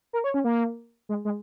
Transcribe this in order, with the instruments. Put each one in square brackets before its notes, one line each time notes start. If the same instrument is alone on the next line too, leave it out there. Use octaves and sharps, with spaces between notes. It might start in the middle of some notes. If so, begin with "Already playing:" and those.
[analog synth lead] A#4
C#5
C#4
A#3
G#3
G#3